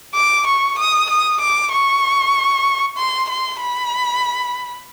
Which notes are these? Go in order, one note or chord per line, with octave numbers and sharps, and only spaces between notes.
D6
C#6
D#6
D#6
D6
C#6
C6
C6
B5